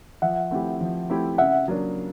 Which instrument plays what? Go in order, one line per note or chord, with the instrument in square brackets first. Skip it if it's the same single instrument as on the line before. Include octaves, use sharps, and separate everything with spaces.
[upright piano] F3 [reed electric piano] E5 F#5
[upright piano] A3 C4 E4 G4
F3
A3 C4 E4 G4
[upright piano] C#3 [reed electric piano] E5 F#5
[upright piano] F#3 A#3 D4